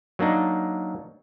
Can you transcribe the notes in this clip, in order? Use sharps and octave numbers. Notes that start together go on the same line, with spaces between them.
F#3 A#3 D4 D#4